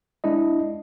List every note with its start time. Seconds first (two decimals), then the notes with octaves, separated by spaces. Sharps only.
0.24 G#3 D4 E4 D#5